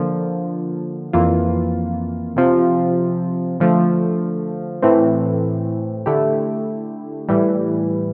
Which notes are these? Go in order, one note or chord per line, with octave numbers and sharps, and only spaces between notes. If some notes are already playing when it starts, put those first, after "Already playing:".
Already playing: D3 F3 A#3
F2 E3 A#3 F4
C3 F3 C4 F4
D3 F3 A3
A2 E3 A3 C4
D3 A3 E4 G4
A2 E3 G3